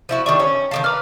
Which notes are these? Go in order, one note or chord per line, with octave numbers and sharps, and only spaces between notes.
F3 E4 F#4
D#3 G3 D4 C#6
C#4
D#3 D4 F5 A5
B4 A#5 D6 F6